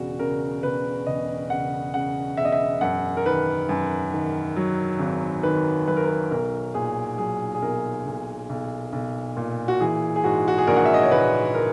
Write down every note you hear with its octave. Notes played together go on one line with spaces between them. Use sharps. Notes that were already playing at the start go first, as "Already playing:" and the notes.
Already playing: E1 C#3 F#4
C#3 A#4
E1 B4
E1 D#5
C#3 F#5
C#3 F#5
E1 E5
D#5
E5
F#2 F#5
A#4
D#3 B4
F#2
D#3
F#3
G#1
D#3 B4
F#3 B4
A#4
B4
B1 A#4
A#2 G#4
F#3 G#4
G#4
B1 A#4
B1
B1
B1
A#2
F#4
E3 G#4
G#4
G#2 F#4
F#4
G#4
A#1 A#4
F#5
E5
D#5
C#5
A#1 B4
A#4